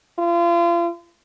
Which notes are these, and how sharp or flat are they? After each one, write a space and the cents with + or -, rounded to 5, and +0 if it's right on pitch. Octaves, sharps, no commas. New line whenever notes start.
F4 -35